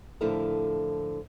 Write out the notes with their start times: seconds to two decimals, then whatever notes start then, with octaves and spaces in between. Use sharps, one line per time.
0.21 A2 D3 F3 E4 A4 A#4